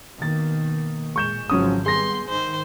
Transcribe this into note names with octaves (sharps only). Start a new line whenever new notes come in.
B2 D#3 A#3 A6
A#2 G#3 C#6 G6 E7
G#1 C#3 F3 F#3 C#4 D#6
G3 B3 G#4 C6 A#6
G#2 D#3 C5